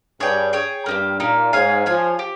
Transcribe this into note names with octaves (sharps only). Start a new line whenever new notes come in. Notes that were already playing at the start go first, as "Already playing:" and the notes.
G2 G#4 C#5 G5
G#4 C#5 G5
G2 A#3 D#4 G4
A#2 A#3 D#4 G4
G#2 G#4 C#5 F5 G#5
F3 G#4 C#5 F5 G#5
G4